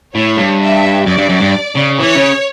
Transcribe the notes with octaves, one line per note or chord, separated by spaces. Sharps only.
A2 C#5
G2
E5
F#2 D5
G2
F#2
G2
C#3
E3 C#5
C#3